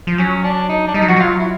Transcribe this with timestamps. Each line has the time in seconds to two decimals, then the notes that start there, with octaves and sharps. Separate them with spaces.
0.07 F3
0.18 F#3 C#4
0.44 D4
0.69 D#4
0.88 D4
0.94 G3 D#4
1.02 F#3
1.08 F3 F#4
1.16 F#3 F4
1.39 E4